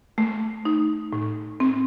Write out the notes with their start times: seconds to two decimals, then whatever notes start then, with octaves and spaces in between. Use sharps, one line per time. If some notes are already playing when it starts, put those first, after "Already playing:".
0.18 A3
0.65 D#4
1.13 A2
1.60 C4